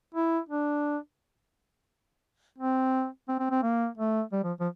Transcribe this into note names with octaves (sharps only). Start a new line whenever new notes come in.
E4
D4
C4
C4
C4
C4
A#3
A3
G3
F3
F3